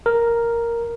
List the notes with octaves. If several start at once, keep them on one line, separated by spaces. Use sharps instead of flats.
A#4